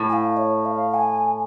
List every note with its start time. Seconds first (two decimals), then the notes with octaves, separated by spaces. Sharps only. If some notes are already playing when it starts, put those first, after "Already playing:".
Already playing: A2
0.09 G#5
0.13 F5
0.37 C#5
0.66 F5
0.94 G#5